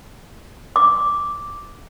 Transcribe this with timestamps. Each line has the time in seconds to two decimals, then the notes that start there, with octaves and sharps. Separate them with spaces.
0.76 D6